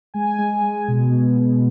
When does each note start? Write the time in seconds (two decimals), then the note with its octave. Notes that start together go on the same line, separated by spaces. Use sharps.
0.14 G#3 G#5
0.38 G#3
0.63 G#3
0.88 B2
1.12 B2
1.36 B2